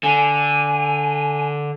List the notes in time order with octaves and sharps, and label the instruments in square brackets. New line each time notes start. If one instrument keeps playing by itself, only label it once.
[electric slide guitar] D3 [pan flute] G#5